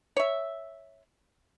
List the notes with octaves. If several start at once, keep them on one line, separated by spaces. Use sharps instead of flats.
C#5 E5